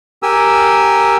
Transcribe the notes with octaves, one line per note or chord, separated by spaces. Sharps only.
G4 A#4 G#5 E6